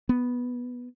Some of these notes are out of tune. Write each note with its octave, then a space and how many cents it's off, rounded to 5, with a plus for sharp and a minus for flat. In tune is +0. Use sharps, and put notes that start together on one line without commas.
B3 -5